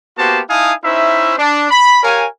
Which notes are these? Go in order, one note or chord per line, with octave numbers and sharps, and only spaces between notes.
A#3 B3 F#4 G4 C5 A5
D#4 E4 F5 G#5 A5 D#6
C#4 D#4 E4 C5 E5
D4
B5
G4 A#4 C#5 F5 G#5